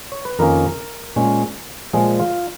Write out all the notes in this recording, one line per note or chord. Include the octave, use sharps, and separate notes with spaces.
C#5
B4
F2 D#3 A#3 C#4 A#4
A#2 G#3 C#4
A#2 F3 G#3 G#4
F4